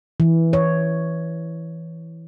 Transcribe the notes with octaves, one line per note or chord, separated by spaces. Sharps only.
E3
C#5